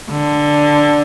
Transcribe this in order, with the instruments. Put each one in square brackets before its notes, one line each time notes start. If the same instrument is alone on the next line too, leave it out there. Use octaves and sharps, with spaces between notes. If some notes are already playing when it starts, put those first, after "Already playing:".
[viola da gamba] D3